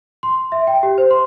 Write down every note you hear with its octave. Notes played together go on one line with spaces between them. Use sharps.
C6
E5
G5
G4
C5
C6